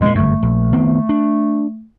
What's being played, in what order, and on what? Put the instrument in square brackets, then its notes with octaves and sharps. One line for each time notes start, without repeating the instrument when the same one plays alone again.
[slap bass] E2 A#2 [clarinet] G#3
[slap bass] G1 F#2 [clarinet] A3
[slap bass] A#1
D#3 B3 C4
D4